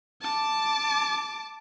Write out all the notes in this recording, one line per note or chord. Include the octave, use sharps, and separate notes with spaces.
A5 D6